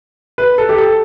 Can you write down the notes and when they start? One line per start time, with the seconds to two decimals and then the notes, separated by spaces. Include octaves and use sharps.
0.38 B4
0.58 A4
0.69 G4
0.78 A4